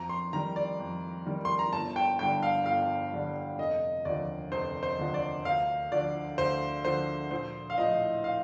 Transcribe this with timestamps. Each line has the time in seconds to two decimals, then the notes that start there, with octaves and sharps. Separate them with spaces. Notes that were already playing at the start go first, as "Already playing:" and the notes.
Already playing: F2 A#5
0.09 C6
0.33 D#3 G3 A#5
0.56 D5
0.79 F2
1.26 D#3 G3
1.45 C6
1.59 A#5
1.72 G1 A5
1.96 G5
2.19 G2 D3 G3 G5
2.43 F5
2.66 G1 F5
3.12 G2 D3 G3
3.59 F1 D#5
4.05 D#2 D3 F3 D5
4.52 F1 C5
4.83 C5
4.99 D#2 D3 F3
5.14 D5
5.45 D2 F5
5.92 D3 F3 D5
6.38 D2 C5
6.85 D3 F3 C5
7.31 A#1 C5
7.70 F5
7.78 A2 F3 D#5
8.24 F5